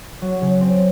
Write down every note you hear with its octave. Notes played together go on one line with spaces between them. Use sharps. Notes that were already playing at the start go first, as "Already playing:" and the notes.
F#3
C#3
C4